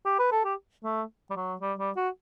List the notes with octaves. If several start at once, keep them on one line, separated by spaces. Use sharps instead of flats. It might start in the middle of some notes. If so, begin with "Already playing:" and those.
G4
B4
A4
G4
A3
G3
F#3
G3
G3
F#4